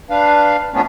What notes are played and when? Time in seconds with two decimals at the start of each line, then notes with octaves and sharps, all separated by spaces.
0.10 D4 B4 F5
0.74 F3 A3 B3 C#4 D4